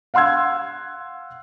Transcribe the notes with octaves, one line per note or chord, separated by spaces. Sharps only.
F5 F#5 C6 E6 G#6